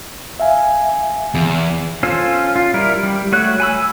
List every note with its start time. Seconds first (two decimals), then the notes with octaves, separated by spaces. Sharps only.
0.40 E5 F5 G#5
1.35 E2
2.03 C#4 F4 A4 C5
2.56 F4
2.74 G3 E4 A#4
3.03 G3
3.32 A3 F#4 C#5 F#6
3.60 G#5 B5 E6